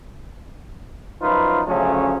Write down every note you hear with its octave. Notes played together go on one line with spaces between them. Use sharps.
F#2 F3 D#4 F4 B4
D2 C#3 F3 F#3 A3 C#4